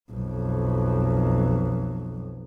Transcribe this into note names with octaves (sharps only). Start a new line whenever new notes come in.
B1 F2